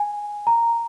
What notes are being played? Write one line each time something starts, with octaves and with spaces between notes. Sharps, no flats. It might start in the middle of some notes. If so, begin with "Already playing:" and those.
Already playing: G#5
A#5